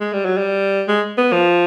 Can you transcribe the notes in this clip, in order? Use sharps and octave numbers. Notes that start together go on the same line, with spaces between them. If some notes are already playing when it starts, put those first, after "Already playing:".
G#3
G3
F#3
G3
G#3
B3
F3